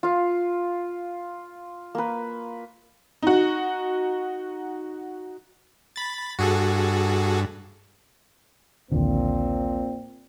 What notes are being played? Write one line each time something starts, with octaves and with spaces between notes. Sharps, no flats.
F4 F5
A#3 B4
D#4 F#4
B5 A6
G2 F#4 G#4 A4
A#1 D#2 A#2 D3 C4